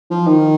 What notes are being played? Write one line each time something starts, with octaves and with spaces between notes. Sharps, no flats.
F3
D#3